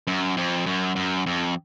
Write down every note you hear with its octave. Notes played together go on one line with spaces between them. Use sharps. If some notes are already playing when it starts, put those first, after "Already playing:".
F#2
F2
F#2
F#2
F2